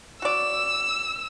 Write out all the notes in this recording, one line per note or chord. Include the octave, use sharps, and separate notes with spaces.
F#4 D5 E6